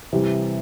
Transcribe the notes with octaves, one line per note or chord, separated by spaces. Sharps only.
C3 E3 G3